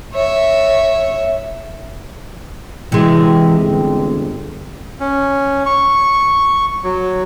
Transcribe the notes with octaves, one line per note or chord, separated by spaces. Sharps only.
C#5 E5
C3 E3 G#3
G1
C#4
C#6
F#3